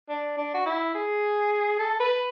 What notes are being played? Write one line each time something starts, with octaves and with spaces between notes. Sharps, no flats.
D4
D4
F#4
E4
G#4
A4
B4